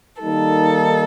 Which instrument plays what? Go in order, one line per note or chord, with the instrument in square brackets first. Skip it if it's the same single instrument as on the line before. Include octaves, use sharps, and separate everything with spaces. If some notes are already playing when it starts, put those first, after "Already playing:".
[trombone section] D#3 G3 A#3 D#4 [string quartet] A4